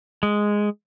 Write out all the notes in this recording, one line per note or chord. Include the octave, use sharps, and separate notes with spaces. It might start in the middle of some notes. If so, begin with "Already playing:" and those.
G#3